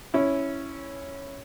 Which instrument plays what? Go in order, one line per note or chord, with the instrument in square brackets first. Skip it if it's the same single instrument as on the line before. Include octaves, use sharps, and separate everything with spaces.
[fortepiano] C#4 E4